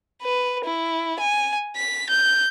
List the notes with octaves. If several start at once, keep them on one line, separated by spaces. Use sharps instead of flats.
B4
E4
G#5
B6
G6